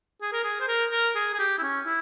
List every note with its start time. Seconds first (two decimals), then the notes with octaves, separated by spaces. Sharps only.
0.22 G#4
0.32 A#4
0.44 G#4
0.61 C5
0.68 A#4
0.92 A#4
1.16 G#4
1.34 G#4
1.39 G4
1.58 E4
1.63 C#4
1.86 E4